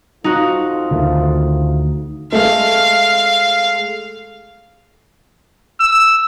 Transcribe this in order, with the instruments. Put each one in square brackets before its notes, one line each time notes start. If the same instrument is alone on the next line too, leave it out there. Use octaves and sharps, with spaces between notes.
[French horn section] F2 F4 [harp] D#4 F#4
[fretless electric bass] D2 D#3 A3
[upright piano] G#3 A3 [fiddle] F5
[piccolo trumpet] E6